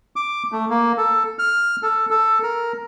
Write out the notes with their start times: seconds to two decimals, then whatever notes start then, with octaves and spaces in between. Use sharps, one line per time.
0.16 D6
0.52 A3
0.70 A#3
0.98 A4
1.39 F6
1.83 A4
2.10 A4
2.43 A#4